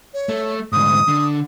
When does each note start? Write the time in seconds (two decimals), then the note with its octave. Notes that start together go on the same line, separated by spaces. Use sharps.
0.14 C#5
0.29 A3
0.72 D2 G#2 D#6
1.08 D3